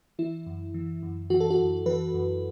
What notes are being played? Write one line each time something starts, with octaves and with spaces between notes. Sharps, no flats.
E3 E4
F#2
E3
F#2
E3 F#4
A4
F#4
F#2
E3 B4
F#2